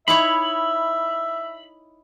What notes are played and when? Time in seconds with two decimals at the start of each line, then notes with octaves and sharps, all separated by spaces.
0.08 D#4 E4 C#5 E5 B5